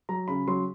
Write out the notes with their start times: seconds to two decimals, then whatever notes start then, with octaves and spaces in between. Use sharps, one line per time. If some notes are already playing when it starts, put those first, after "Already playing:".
0.09 F#3 A#5
0.28 C#3 B5
0.48 F#3 C6